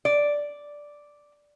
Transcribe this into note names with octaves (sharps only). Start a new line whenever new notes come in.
D5